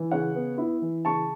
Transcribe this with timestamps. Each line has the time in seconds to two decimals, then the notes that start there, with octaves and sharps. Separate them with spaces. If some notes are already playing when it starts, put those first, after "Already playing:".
Already playing: E3
0.11 C#3 C#5 F#5
0.35 B3
0.58 E4
0.82 E3
1.05 C#3 A5 C#6